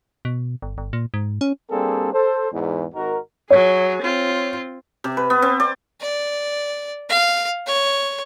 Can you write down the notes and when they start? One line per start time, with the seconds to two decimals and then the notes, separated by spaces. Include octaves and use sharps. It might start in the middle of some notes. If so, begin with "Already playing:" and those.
0.25 B2
0.62 G1
0.78 G1
0.93 A#2
1.14 G#2
1.41 C#4
1.71 G3 A#3 C4 D4 G#4 A4
2.13 A4 C5
2.52 E2 G#2
2.95 G#1 D#4 F#4 A#4
3.50 F#3 G#4 C#5
4.03 C4 F4
5.04 C3
5.17 B4
5.30 B3
5.42 C4
5.60 D5
6.01 D5
7.10 F5
7.67 C#5